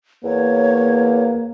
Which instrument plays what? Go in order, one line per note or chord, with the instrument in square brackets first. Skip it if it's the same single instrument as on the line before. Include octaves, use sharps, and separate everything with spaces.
[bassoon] E2 [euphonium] A#3 [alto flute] C#5